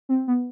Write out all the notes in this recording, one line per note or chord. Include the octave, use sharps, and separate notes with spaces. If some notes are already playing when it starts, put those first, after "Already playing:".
C4
B3